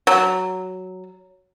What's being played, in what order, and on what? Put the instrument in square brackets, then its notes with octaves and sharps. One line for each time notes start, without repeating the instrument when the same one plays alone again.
[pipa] F#3